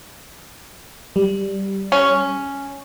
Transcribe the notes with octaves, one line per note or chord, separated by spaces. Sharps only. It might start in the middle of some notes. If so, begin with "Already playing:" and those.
G3
C#4